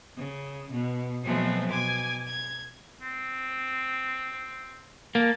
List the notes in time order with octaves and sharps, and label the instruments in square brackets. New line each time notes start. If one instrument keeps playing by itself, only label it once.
[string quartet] C#3
B2
B2 F3 F#3 G#3 A3 C4
B2 G#5 D6 G#6
G#6
[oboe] C4
[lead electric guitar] A#3 [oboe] A5